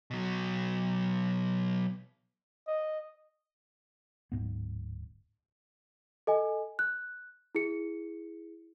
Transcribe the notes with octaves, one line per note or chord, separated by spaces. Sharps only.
B2 F#3
D#5
D1 F2 G#2 B3
A4 D#5 G#5
F#6
E4 G#4 C#7